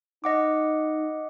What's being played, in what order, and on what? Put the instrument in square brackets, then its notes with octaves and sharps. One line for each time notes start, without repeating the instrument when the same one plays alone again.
[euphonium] D#4 [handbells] D#5 F#5 D6